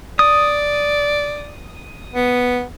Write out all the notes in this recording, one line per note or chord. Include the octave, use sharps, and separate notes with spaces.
D5 D#6
B3